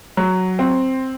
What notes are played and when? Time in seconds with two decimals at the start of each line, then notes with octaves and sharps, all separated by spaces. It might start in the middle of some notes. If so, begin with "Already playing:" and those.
0.17 F#3
0.59 C4